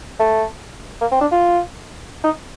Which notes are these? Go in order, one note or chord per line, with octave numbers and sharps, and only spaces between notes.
A3
A#3
C4
D4
F4
D#4